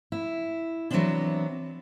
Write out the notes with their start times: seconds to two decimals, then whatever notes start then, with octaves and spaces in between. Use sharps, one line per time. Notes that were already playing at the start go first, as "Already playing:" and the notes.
0.12 E4
0.91 E3 F#3 G3 B3 C4 D4